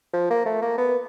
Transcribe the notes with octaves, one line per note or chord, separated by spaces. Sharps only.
F3
A#3
A3
A#3
B3